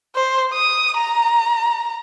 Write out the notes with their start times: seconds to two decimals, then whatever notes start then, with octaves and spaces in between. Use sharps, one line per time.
0.15 C5
0.53 D#6
0.97 A#5